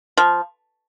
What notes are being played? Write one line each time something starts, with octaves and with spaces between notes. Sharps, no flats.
F3